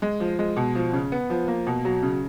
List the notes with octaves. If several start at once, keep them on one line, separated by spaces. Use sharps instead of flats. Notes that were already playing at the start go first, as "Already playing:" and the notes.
G#3
F3
G#3
B2
F3
C#3
B3
F3
A#3
B2
F#3
C#3